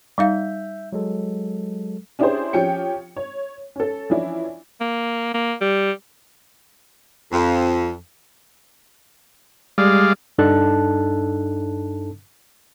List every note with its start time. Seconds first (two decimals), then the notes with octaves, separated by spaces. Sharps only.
0.18 G3 D#4 E5 F5 G6
0.92 F#3 G#3 A4
2.19 C#4 D4 E4 G4 G#4 C5
2.53 F3 C#4 G4 G5 C#7
3.17 C#5
3.76 C#4 A4
4.10 E3 F3 C#4 D4 E4
4.81 A#3
5.34 A#3
5.61 G3
7.32 F2
9.78 G3 G#3 D5 F5
10.38 G2 D4 D#4 A4 A5 F#6